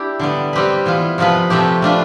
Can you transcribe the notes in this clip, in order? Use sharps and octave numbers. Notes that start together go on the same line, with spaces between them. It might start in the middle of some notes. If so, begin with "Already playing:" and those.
Already playing: D4 E4 G4
D3 G3 B3
G3 C4 G4 B4
E3 B3 F4
C3 F3 B3 F4 B4
C3 F3 A3 C4 G4
A3 D4 F4 B4